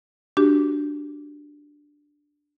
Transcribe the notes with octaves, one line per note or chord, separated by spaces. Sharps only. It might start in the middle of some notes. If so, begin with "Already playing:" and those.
D4 F#4 G4